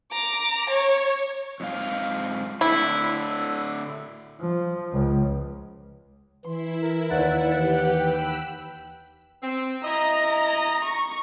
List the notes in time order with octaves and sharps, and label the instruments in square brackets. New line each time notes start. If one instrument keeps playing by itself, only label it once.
[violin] A#5 D6
C#5
[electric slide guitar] F2 G#2 F5
[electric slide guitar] A2 D3 [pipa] E4
[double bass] F3
C#2
[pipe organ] E3 [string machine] E4 [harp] C6
[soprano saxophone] A#4
[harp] D#2 [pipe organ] B4 D5 [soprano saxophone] F#5
[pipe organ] E3 B4 [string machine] G4
[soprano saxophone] G5 [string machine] B5 E6 F#6
[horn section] C4
[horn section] E4 D#5 [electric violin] A#5
[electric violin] C#6